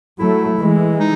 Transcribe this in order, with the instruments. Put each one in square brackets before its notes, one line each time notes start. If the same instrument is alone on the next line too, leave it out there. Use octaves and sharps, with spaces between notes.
[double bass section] F#3 A3 [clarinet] E4
[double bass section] E3 G#3
[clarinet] D#4